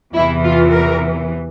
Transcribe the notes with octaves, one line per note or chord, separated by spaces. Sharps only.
E2 C3 E3 E4
F4
A#4